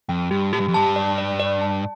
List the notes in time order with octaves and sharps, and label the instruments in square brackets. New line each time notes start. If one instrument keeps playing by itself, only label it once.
[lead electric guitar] F2 [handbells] G5
[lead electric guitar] G2 [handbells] G4
[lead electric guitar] A2 [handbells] G4
[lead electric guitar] G2
F2
[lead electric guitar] G2 [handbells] A5
[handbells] D5
D5
D5
A5